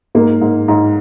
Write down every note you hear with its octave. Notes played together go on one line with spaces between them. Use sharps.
G#2 A#3
G#2
G#2